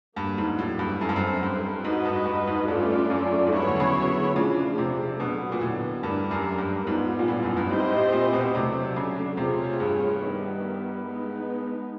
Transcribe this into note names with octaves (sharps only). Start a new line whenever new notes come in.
G2 D3 F#3 A#3
G#2
A2
G2
F#2 C4 E4 A4 C5
G2
F#2
G2
G#2 D#4 F#4 B4 D#5
G2
G2
G#2
G2 A3 C#4 F4 A4 D5
F#2
G#2
G2 F#3 B3 E4 G#4 C#5
D3
C#3
D3
C#3 F3 A3 D4 F4 G#4
C3
B2 D3 F#3 B3
A#2
A2
G2 A3 D4 G4 A#4
F#2
G2
G#2 G3 B3 D4 F4
A#2
A2
F#2
G2
G#2 C4 E4 G4 C5 D#5
A2
A#2
B2
C3 F#3 A3 D4
C#3
C3 A3 C4 F4 G#4 C#5
G2
D#3 G3 B3 E4
G#3 B3 D#4